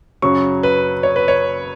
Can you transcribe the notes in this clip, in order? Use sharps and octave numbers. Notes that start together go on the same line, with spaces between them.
F#2 C#3 F#3 C#6
B4
C#5
B4
C#5